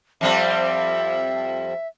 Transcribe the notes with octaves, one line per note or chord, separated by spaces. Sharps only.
F2 G3 C4 E5